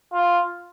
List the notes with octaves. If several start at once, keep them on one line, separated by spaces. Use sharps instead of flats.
F4